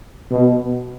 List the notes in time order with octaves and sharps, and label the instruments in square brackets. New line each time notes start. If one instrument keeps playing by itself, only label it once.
[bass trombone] B2